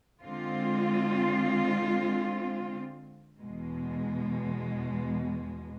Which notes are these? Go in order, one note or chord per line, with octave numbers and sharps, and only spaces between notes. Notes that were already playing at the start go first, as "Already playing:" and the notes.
D3 G#3 C4 F4
E2 B2 G#3